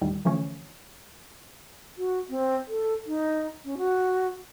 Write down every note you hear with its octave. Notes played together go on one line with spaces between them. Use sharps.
D#2 A2 D#3 G3
D3 E3 F3 A3 C#4
F#4
C4
A4
D#4
C#4
F#4